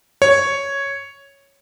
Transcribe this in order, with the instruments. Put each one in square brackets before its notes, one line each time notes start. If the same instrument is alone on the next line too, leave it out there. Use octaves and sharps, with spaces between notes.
[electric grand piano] C#5